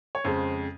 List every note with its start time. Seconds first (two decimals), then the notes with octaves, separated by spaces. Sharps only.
0.15 C#5
0.24 F2 C#3 G#3 C5